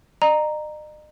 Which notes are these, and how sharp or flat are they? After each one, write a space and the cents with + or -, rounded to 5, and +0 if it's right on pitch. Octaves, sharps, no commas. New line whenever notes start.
D#5 -45 A#5 +0